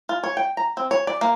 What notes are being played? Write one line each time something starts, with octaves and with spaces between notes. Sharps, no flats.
F4
C#5
G5
A#5
C4
C#5
D5
A#3